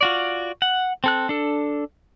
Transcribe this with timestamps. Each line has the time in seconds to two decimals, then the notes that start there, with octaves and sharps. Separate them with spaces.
0.01 F4 F#4 D5
0.62 F#5
1.04 C4 A4 F#6
1.29 D4 A4